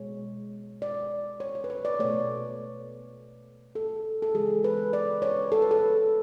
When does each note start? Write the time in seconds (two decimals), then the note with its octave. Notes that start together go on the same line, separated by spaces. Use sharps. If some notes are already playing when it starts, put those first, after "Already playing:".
Already playing: B2 G#3 C#5
0.82 D5
1.40 C#5
1.55 C#5
1.64 B4
1.70 C#5
1.85 D5
1.99 B2 A3 C#5
3.75 A4
4.22 A4
4.35 C#3 E3 G#3 G#4
4.64 B4
4.93 D5
5.22 C#5
5.52 A4
5.62 B4
5.71 A4